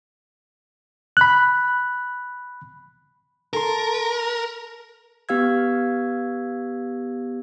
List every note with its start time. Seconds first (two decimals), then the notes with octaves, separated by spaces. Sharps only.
1.17 B5 F#6
3.53 A4 A#4 A5 C6
5.29 B3 G4 F5 E6 G#6